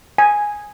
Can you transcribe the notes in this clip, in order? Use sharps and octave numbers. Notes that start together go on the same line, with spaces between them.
G#5